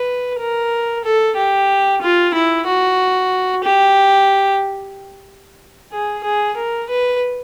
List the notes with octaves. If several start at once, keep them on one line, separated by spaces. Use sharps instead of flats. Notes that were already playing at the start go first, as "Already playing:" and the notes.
Already playing: B4
A#4
A4
G4
F4
E4
F#4
G4
G#4
G#4
A#4
B4